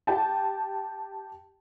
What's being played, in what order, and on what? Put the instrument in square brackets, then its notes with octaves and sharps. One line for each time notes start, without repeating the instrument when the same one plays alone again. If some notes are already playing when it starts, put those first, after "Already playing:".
[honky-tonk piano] G4 G5 A5